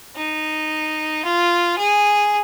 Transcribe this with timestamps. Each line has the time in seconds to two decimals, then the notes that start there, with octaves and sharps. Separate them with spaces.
0.16 D#4
1.25 F4
1.78 G#4